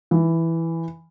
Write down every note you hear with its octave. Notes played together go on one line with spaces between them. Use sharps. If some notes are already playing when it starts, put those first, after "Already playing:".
E3